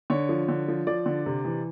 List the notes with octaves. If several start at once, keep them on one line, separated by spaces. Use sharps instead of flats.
D3 C#5
F3
D3
F3
F3 D5
D3
C3
E3